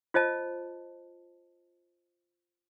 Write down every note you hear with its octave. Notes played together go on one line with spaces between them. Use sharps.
F4 C5 D#5 A5